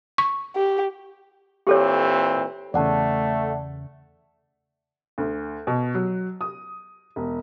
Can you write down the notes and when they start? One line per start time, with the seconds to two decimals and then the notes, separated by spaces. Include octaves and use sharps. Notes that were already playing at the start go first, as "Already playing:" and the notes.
0.18 C#6
0.56 G4
1.67 A#2 E3 C4 G4 A4 C#5 F5 C#6
2.74 E2 C#3 A3 D5 F#5 A5
5.18 D2
5.67 B2
5.94 F#3
6.41 D#6
7.16 E1